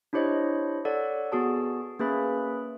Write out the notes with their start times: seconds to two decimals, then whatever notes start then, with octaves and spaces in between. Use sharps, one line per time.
0.13 D4 E4 G4 C5 C#5 D#5
0.85 A4 C#5 D5 F#5
1.32 B3 F#4 G#4 A5
1.99 A#3 C#4 G#4 B4 E5 B5